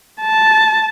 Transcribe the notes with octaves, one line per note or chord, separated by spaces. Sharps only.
A5